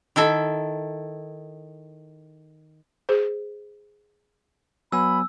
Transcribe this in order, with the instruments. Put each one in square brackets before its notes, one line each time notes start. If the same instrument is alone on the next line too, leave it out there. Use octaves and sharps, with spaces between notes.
[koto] D#3 E4 A4 E5
[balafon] G#4 C5
[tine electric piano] F#3 B3 G#5 [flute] B5 [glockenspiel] E6